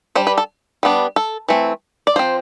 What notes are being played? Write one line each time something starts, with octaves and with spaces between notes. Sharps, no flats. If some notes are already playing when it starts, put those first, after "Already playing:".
G3 D4 C5
B4
A4
G3 B3 D4
A4
E3 A3 C4
D5
F3 C4 C5